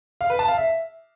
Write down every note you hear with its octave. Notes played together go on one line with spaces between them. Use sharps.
F5
B4
A5
F5
E5